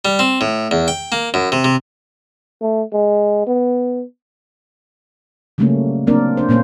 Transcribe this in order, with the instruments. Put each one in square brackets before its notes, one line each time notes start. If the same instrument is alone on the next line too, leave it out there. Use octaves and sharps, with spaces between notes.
[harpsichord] G3
C4
A2
E2
G5
A#3
F#2
C3
C3
[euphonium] A3
G#3
B3
[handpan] C#3 F#3 G3 A3 A#3 C#4
F#3 A#3 C4 D4 A#4 D5
D4 C5
A#2 A#3 C#4 C5